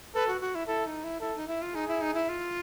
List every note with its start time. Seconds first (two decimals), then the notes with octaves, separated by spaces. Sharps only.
0.14 A4 B4
0.28 F#4
0.41 F#4
0.55 E4
0.68 E4 A4
0.86 D#4
1.04 E4
1.21 E4 A4
1.35 D#4
1.48 E4
1.62 F4
1.75 D#4 G#4
1.88 E4
2.01 D#4
2.14 E4
2.29 F4